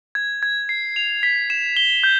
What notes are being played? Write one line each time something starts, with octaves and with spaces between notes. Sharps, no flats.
G#6
G#6
C7
F7
B6
E7
G7
G6